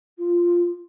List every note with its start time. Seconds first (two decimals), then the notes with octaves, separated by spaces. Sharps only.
0.18 F4